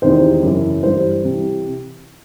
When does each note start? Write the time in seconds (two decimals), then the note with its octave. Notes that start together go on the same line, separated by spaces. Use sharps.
0.02 E2 C3 D#3 C5
0.43 F#2 C#3 E3
0.83 G2 E3 C5
1.23 C3 E3